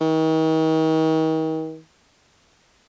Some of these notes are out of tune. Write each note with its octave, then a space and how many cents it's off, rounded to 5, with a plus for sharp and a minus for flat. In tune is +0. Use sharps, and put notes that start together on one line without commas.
D#3 +40